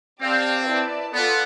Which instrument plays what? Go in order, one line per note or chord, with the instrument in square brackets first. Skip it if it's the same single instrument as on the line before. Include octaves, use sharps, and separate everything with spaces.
[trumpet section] C4 [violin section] G4 D5 F5 A5
[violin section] E4 B4 D5 A5
[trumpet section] B3 [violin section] F4 A4 D5